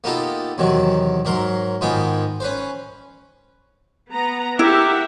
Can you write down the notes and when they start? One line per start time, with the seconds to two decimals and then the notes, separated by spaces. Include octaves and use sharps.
0.04 A#3 B3 D#4 F4 G4 A4
0.58 E2 C3 D#3 F#3
1.25 G#2 F#3 A#4 C6
1.81 G#2 D#3 B3 F4 G#4 G5
2.40 C#4 B4 C5
4.11 B3 A#5
4.59 E4 G4 A#4 E5 F#5